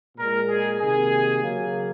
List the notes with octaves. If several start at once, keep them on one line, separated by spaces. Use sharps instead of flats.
A#2 G#3 A#4
G#4
C3 D#3 A#3 G#4
C#3 F#3 A#3